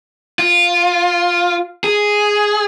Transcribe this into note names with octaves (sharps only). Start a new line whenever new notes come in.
F4
G#4